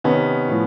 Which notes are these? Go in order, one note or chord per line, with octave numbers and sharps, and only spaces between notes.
C3 D#3 B3 C#4
A2 F3